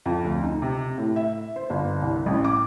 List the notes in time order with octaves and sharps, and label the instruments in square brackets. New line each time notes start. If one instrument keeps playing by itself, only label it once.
[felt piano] F2
D2
D#4
C3
A2
E5
C5
G1
C2
A1
D6